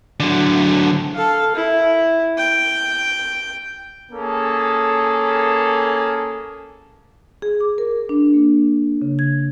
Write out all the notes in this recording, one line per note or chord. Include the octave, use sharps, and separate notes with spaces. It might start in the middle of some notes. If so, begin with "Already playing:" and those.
D3 F#3
A4 F5
E4
G5
A#3 C#4 G#4 A4
G#4
D6
A#4
D4
A#3
C#3
G#6